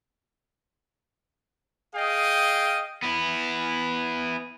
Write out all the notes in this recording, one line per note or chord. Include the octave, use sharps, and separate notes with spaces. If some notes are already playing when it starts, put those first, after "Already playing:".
G#4 D#5 F5 G5
B3 E4